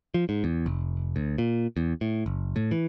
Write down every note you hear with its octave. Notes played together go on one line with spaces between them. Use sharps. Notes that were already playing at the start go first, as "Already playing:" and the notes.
F3
G#2
E2
F1
D2
A#2
E2
A2
F#1
A2
E3